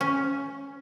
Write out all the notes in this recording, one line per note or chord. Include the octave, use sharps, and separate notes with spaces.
C#4